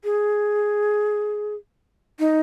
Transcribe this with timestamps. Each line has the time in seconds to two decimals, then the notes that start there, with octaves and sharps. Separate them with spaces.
0.04 G#4
2.19 D#4